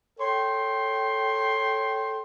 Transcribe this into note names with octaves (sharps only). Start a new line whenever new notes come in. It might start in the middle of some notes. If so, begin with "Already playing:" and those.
A4 C#5 G5 C6